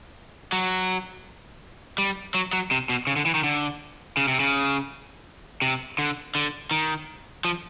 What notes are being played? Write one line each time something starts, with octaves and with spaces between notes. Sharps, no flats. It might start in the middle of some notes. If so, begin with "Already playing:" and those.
F#3
G3
F#3
F#3
C3
B2
C#3
D3
E3
D#3
D3
C#3
C3
C#3
C3
D3
D3
D#3
F3